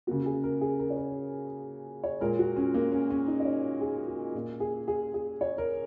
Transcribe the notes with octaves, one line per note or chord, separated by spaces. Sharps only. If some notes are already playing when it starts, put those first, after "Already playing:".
C#3 A#3 F#4
G#4
A#4
G#4
A#4
C#5
A#4
C#5
A#2 G#3 A#4
F#4
C#4
A#3
C#4
C#4
D#4
D#5
C#5
G#4
F#4
A#2 A#3
G#4
G#4
G#4
C#5
A#4